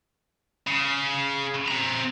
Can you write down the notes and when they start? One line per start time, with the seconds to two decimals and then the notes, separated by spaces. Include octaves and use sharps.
0.67 C#3
1.68 C4 A#5